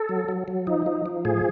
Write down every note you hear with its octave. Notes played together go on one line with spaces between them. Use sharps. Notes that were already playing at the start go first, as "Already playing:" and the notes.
Already playing: A4
F#3
F#3
F#3
F3 D#4
F3
F3
A2 G#4